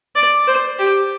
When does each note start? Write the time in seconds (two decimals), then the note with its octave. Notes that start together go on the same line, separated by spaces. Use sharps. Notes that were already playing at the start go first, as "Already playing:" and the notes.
0.15 D5
0.47 C5
0.79 G4